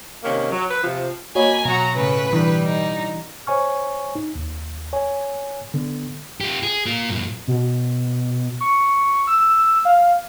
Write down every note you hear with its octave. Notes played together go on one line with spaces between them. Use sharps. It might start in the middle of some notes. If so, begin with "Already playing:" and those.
C3 D#3 A#3 C#4
F#3
B4
C3 F3
A#3 F#4 C#5 D#5 G#5 B5
B2 F#3 F#4 A#5
A2 C#3 B4
B2 D3 E3 G3
D#4
C5 C#5 G#5 C#6 F6
D#4
D#2
C#5 G#5
D3 B3
F4 G4
G#4
A#3 F4
F#2 A#2
B2
C#6
E6
F5